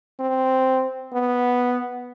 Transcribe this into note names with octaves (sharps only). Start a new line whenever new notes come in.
C4
B3